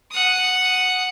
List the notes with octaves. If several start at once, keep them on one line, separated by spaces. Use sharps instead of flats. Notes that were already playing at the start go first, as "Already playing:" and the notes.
F#5 D#6